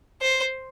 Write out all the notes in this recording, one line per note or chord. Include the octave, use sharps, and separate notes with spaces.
C5